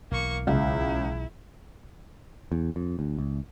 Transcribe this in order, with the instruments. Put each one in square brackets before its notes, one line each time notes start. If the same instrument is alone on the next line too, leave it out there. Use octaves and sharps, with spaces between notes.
[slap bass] B1 E3 [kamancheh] A#3 C#6
[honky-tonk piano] C#2 [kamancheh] E4
[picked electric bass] E2
F2
D2
C#2